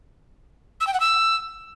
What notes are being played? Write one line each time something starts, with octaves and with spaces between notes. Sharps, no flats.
E6
G5
F#5
E6